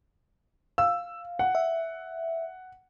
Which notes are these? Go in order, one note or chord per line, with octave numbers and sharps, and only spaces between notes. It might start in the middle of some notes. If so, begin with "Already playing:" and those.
F5 E6
F#5
E5